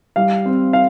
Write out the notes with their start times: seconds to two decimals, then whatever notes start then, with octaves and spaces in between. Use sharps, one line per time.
0.16 G3 F5
0.46 C4
0.73 F5